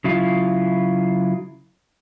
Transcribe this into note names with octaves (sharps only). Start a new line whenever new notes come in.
C#3 F#3 E4 F4